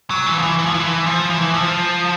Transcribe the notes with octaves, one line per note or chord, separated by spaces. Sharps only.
F#3
E3
F3
E3
E3
F3
E3
F3
E3
F3